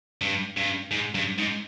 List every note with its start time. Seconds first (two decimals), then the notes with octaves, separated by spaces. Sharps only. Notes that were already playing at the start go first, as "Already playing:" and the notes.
0.22 G2
0.57 G2
0.91 G#2
1.15 G2
1.38 G#2